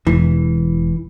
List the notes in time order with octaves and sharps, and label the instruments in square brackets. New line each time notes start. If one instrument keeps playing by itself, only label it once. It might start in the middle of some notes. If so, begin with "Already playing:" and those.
[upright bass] E1 [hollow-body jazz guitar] E3